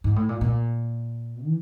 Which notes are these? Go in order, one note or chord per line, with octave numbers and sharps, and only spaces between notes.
G#2
A2
A#2
A#2
E3